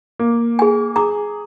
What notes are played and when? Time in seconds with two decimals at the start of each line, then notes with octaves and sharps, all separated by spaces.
0.19 A#3
0.59 G#4 G#5
0.96 G#4 A#5 D6